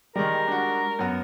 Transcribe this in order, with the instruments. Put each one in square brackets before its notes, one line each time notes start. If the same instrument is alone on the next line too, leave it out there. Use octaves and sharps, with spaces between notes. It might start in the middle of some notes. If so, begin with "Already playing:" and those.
[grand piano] D#3 D5 [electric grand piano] G3 G#3 [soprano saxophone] A#4
[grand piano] D4 F#4
F#2 B3